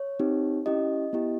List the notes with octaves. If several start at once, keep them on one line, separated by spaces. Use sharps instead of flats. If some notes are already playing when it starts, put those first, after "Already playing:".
Already playing: C#5
C4 D#4 G4
C#4 E4 G4 D#5
B3 E4 G4